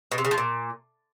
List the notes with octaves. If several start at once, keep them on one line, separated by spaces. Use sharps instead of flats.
B2
C3
C#3
F3
A#2